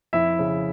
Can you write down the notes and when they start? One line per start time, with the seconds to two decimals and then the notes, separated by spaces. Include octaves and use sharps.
0.13 F2 E4 E5
0.39 C#3